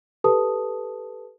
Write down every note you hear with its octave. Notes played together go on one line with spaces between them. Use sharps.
G4 A4 B4 A5 D#6